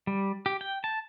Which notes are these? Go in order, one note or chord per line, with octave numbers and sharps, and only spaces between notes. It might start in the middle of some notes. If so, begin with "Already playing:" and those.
G3
G4
G5
A5